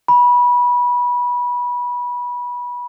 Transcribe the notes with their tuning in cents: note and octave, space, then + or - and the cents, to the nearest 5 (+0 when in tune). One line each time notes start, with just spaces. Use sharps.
B5 -20